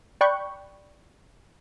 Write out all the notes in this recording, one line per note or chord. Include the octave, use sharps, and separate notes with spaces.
D5 G5 B5 C#6 F#6 G6